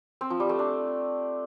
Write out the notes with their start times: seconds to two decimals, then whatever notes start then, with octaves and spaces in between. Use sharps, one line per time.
0.21 C4
0.30 F3
0.40 G3
0.49 A3
0.59 D4